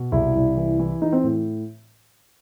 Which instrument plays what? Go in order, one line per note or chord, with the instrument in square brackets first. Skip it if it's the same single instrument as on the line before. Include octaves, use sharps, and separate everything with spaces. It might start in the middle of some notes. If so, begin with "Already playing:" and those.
Already playing: [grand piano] B2
C2 E4
C2
E3
E3
E3 D#4
C4
A2